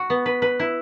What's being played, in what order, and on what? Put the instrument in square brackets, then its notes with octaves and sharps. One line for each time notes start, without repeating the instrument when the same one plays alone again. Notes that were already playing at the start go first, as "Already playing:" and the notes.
Already playing: [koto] F#4
B3
B4
B4
E4